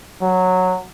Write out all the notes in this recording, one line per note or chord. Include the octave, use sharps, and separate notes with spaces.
F#3